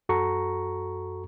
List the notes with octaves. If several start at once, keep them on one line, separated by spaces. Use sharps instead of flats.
F#2 F#4 A4 A#5 C#6